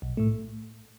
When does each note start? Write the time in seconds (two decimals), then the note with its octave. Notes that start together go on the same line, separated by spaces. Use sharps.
0.02 B1
0.17 A2 A3